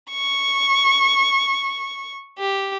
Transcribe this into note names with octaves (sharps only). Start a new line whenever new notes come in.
C#6
G4